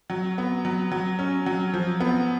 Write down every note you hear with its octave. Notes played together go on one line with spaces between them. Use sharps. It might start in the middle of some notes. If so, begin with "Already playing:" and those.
F#3
B3
F#3
F#3
C#4
F#3
F3
B3